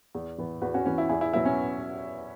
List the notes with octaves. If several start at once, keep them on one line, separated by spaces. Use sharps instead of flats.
E2
E3 B3
E2 F#4 B4
C#4 F#4
E3 B3 C#4
E4
E2 E4 G#4
E4
B2 F#3 B3 E4
C#4